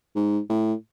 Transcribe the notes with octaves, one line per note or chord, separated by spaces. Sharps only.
G#2
A2